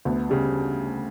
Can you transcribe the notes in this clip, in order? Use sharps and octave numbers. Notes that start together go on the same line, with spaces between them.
D2 B3
C#3 G3